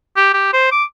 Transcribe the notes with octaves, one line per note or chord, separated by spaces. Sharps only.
G4
G4
C5
D6